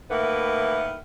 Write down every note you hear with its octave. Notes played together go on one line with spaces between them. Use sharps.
A2 D#3 A#3 E4 B4 F#5